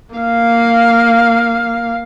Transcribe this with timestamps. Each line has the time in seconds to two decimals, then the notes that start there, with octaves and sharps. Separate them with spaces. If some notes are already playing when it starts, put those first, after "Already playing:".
0.15 A#3 F5